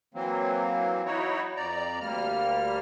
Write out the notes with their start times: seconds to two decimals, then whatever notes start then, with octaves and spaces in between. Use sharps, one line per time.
0.14 E3 F#3 A#3 C4
1.06 D#4 E4 F#4 C#5
1.56 F2 D5 A#5
2.01 D2 G3 A#3 F6